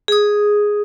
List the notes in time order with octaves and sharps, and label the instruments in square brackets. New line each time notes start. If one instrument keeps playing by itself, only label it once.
[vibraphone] G#4 D#6